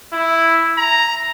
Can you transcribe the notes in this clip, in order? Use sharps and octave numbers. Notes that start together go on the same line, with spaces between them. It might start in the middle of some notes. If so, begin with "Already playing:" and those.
E4
A#5